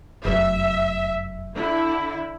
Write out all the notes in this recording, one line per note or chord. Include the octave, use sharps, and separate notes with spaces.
F1 F#2 E5
D3 E4